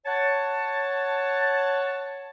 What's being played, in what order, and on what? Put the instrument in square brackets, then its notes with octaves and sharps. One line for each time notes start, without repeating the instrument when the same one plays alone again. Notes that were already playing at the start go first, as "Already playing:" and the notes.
[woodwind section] C#5 F#5 A5